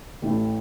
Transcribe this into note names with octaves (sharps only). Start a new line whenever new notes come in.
A1 A2 A3 C#4 E4